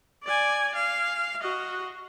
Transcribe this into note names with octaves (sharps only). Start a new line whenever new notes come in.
D5 G#5
F5
F#4 D#5